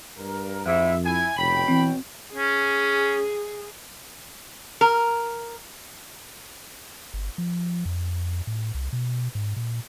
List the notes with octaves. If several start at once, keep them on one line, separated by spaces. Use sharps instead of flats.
G2 A#4
F2 G#2 E4 E5
E4 G#5
F1 B2 C#5 G5 B5
E3 C4
C#4 G#4
A#4
G1
F3
F2
A2
C2
B2
G#2
A#2